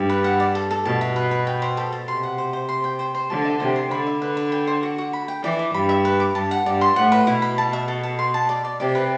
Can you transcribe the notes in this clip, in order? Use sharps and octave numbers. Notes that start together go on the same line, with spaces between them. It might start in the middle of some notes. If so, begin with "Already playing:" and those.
Already playing: G2
B4
F#5
D5
A4
A4
B2 A5
E5
B4
B4
G5
C5
A4
A4
C3 C6
F#5
C5
C5
C6
G5
C5
C5
D3 A5
E5
C3 C5
C6
D3 B5
E5
B4
B4
G5
C5
F#4
F#4
B5
G5
E3 D5
D6
G2 B5
E5
B4
D6
G2 A5
F#5
G2 D5
C6
A2 F#5
B4
B2 E4
B5
A5
E5
A4
A4
C6
A5
D5
D5
C3 D5
B4